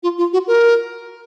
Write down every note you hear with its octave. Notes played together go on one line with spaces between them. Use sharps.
F4
F4
F#4
A#4